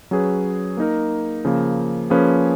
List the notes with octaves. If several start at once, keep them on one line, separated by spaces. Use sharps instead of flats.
F#3 C#4 G#4 B4
A#3 D#4 A#4
C#3 F3 A#3
F3 A#3 C#4 G#4 B4